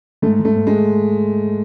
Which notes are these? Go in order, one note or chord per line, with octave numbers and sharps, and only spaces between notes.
G#2 A3
G#2
A3
G#2
G#3